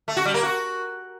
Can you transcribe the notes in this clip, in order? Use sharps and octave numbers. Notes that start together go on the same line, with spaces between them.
A3
F#4
G3
A#3
F#4